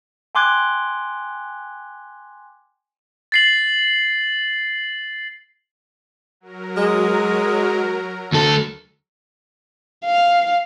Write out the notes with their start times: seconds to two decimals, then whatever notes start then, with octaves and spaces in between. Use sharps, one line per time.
0.35 G5 G#5 C6 D6 F#6 G#6
3.32 A6 C7 F#7
6.40 F#3 A#4
6.77 G#3
8.32 D2 A4
10.06 F5